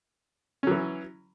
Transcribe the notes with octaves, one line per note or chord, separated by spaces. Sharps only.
E3 F#3 C#4